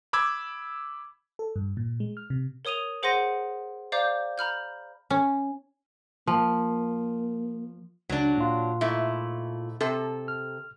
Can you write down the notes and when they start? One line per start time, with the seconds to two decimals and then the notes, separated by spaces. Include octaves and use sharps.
0.13 B5 D6 E6 G#6
1.39 A4
1.56 G2
1.77 A#2
2.00 G#3
2.17 F6
2.30 C3
2.65 A#4 C#5 D#6 D#7 F7
3.03 G#4 C5 F#5 C6 A#6 D#7
3.92 C5 D5 F5 A#5 D6 G6
4.38 A#5 B5 F6 G6
5.10 C#4
6.27 F3 A#3
8.09 C#2 F#3 D4
8.37 A#2 F4
8.81 G#2 A3 E4
9.81 C3 A4
10.28 F6